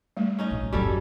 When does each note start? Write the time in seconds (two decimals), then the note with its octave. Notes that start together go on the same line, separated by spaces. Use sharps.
0.17 G3 A3
0.39 C#4 D#4 D#5
0.51 A#1
0.73 A1 F#2 G3 C#4 F#4 A4